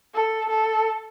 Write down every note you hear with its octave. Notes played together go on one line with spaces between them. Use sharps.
A4
A4